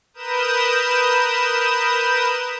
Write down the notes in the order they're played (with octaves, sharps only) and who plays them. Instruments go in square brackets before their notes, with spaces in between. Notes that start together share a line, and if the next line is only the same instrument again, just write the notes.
[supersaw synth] A#4 B4 D#6 G6 E7